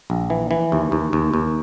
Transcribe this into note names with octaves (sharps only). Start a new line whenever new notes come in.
A#1
E3
E3
D#2
D#2
D#2
D#2